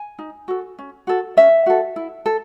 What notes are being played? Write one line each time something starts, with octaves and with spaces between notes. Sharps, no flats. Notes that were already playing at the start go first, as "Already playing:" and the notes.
Already playing: G#5
D#4
F#4 A4
C#4
F#4 A4
C#4 E5
F#4 A4
E4
A4